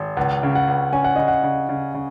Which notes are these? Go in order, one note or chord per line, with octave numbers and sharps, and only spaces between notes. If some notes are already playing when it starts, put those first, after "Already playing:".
Already playing: G#1
C#2 F#5
C#3
F#5
C#2
C#4 G#5
F#5
C#3 D#5
F#5
C#3
C#3
C#3